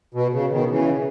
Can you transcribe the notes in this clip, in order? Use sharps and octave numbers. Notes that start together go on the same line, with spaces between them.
B2
C#3
B2 D#3
C#3 E3